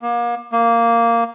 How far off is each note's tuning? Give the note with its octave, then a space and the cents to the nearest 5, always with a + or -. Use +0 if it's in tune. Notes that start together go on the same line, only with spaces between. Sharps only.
A#3 +35
A#3 -5